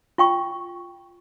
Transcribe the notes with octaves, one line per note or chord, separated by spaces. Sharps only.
F4 G5 C#6